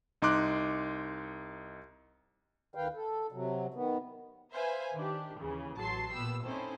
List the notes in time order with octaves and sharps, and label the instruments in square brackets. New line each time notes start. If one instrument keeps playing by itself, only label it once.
[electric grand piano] C2 D#4 C6 D6 F#6
[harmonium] D2 D#3 B4 F5 G5
A4
C3 F#3
D#3 B3
[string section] B4 C5 E5 F5 G#5
D#3 D4 G4
D#2 C#3 E3
A1 F#3 A5 C6 C7
A#2 B3 G4 E6
C4 C#4 D#4 E4 A4 C5